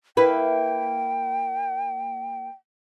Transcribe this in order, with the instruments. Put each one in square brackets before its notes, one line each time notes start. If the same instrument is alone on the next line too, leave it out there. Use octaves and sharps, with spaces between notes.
[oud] A#3 E4 B4 [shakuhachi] G5